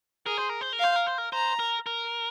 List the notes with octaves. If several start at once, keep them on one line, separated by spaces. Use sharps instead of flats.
G#4 A#4
C5
A#4
C5
A#4
C5 F5
A#4
C5
A#4
C5 A#5
A#4
A#4